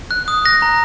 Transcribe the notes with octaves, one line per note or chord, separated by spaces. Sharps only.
F#6
D#6
F#6 A#6
A#5